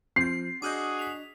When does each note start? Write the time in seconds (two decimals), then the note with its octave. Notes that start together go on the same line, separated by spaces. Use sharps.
0.16 F3 C4 G6 C7
0.62 D4 F#4 G#4 D#5 D6 F6 G6
0.99 B6 F7